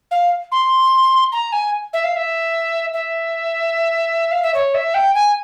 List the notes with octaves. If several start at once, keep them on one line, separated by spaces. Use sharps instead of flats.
F5
C6
A#5
G#5
E5
F5
E5
E5
F5
E5
C#5
E5
G5
G#5